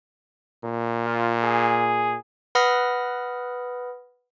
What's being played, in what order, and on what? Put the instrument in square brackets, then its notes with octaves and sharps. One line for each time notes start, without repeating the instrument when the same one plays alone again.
[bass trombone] A#2
[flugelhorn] F4
G#4
[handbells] B4 F#5 B5 D#6 F6 A#6